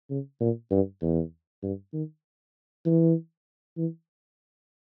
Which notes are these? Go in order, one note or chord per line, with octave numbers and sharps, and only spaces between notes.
C#3
A#2
G2
E2
G2
D#3
E3
E3